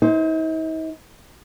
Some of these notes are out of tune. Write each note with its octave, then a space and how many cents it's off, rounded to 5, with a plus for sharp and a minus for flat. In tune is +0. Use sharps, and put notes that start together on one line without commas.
D#4 +45 C5 +0